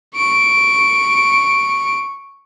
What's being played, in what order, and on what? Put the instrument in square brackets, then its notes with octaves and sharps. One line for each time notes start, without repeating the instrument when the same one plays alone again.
[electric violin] C#6 D7